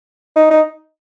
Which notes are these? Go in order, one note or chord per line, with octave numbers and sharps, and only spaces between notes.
D#4
D#4